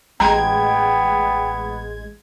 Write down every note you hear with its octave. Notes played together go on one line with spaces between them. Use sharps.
A1 G#3 B3 G5 A#5 G#6